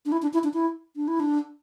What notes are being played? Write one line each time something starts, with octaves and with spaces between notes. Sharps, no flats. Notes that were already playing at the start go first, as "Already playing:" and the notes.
D4
E4
D4
E4
D4
E4
D4
E4
D4